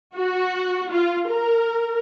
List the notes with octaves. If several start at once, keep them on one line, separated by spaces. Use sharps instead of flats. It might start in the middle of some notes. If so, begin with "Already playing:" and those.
F#4
F4
A#4